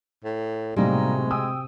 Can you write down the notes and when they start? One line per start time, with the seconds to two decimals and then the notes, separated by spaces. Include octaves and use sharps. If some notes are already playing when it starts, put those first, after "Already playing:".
0.25 A2
0.76 B1 A2 C3 G3 G#3 A#3 D#4
1.31 G5 G#5 D#6 E6